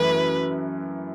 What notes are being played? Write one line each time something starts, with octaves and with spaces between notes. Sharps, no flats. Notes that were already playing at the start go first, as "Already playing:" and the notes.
Already playing: F#2 E3 A3 E4 B4